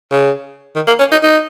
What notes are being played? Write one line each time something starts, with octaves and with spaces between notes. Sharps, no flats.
C#3
D#3
A#3
C#4
D#4
D#4